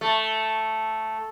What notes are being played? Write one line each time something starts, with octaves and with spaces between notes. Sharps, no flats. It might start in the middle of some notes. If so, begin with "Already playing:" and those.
A3